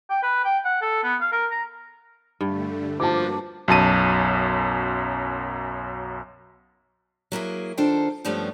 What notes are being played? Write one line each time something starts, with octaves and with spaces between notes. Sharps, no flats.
G5
B4
G5
F#5
A4
B3
F5
A#4
A#5
G2 D3 G3 A3
F3 A#3 F#4 B4 A5 D6
B1 F#2 A5 D#7
F#3 A#3 E4 G#4
D#3 D4 F4 A4 C5 G5
G2 F3 G3 A3 B3 C#4